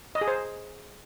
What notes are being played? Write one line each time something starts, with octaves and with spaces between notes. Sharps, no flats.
D#5
G#4
C5